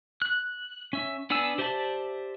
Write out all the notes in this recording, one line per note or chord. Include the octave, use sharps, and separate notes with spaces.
F#6
C#4 E5
B3 D4 D5 G#5 E6
G4 C5 D5 E5 A5